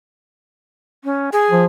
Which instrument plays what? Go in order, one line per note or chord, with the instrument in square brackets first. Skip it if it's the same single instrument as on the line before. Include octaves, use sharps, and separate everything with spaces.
[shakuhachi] C#4
[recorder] G#4 [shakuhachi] G#5
[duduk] F3